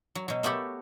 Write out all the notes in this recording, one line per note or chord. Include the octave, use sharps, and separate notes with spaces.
F#3
B2 F#3
A3 B3 F#4 G4 A4